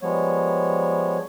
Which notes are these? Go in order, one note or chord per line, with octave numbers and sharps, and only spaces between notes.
F3 G3 G#3 B3 C#5